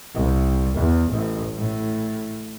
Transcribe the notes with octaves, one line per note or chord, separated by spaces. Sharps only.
C2
E2
A1
A2